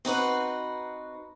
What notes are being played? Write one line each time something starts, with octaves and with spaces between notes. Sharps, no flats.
C4 D#4 F#4 B4